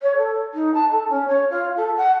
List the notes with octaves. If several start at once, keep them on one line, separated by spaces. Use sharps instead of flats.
C#5
A4
D#4
A5
A4
C#4
C#5
F4
A4
F#5